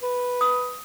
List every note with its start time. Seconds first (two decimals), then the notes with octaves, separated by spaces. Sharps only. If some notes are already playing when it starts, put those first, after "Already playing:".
0.03 B4
0.41 D#6